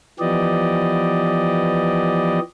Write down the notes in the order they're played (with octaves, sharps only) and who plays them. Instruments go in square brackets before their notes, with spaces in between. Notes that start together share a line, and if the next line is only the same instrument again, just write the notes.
[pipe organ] E3 F3 B3 G4 D5 D#5